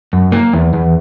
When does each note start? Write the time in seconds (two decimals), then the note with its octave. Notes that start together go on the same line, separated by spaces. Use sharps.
0.13 F#2
0.32 A#3
0.53 E2
0.74 E2